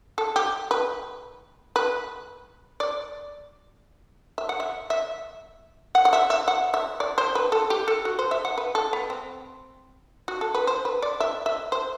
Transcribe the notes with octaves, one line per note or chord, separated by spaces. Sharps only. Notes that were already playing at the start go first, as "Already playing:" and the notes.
A4
G4
B4
B4
D5
E5
F#5
E5
E5
F#5
F#5
E5
E5
F#5
E5
D5
C5
B4
A4
G4
A4
F#4
C5
E5
F#5
B4
A4
B3
C4
F#4
A4
B4
C5
B4
D5
E5
E5
C5